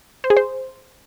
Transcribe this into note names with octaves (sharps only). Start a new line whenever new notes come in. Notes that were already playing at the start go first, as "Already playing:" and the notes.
C5
G#4
C5